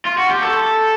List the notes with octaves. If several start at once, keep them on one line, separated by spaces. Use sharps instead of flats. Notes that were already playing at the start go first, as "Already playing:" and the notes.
F4
F#4
G4
A4